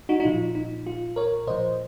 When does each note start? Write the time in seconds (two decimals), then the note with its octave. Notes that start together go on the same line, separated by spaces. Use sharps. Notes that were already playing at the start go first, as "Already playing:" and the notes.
0.09 D#4 F#4
0.20 D#4
0.24 A#2 F3 F4
0.55 D#4
0.87 F4
1.16 A#4 C#5
1.47 A#2 F3 C5 D#5